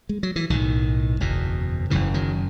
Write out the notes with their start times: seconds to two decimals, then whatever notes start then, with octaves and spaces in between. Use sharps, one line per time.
0.09 G#3
0.23 F#3
0.36 E3
0.50 B1 A2 D#3
1.20 F#1 E2 B2
1.90 F#1 F#2 C#3 E3
2.14 D#3 F#3